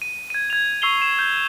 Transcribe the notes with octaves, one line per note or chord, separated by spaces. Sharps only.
D#7
G#6 D#7
G#6 F7
C#6 E6 C7 F7 G7
E7
G6